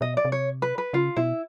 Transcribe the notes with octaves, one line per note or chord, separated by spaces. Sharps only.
B2 D#5
D5
C3
C#5
B4
B4
C#3 F4
B2 E4